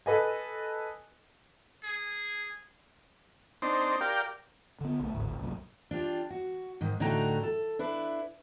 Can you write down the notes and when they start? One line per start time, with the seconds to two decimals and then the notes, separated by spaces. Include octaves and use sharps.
0.06 A4 B4 D#5 G#5
1.84 G#4
3.62 C4 D4 D#4 C6
4.01 G4 A#4 D5 F5 G5
4.81 D3 B3
5.00 B1 A3
5.14 G#1 D2 A2
5.40 C2 F#2 A#2
5.91 D4 F4 G4
6.30 F#4
6.81 G#2 D#3
7.00 A2 D3 D#4 F#4 G5 A#5
7.43 A4
7.79 D4 E4 B4